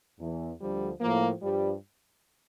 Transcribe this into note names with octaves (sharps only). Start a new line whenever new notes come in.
E2 E3
D2 D3 F3 G3
A2 F3 A#3
G2 F3 G3